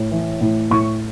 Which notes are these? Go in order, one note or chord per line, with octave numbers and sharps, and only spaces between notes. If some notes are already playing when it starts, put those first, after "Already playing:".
Already playing: A2
E3
A2
A2 C#6